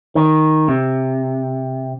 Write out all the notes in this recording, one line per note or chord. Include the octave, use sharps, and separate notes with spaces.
D#3
C3